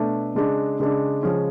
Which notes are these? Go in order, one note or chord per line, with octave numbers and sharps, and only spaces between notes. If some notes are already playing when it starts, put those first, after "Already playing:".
Already playing: B2 A3 D4
C#3 G#3 D4
C#3 G#3 D4
C#3 F3 G#3 C#4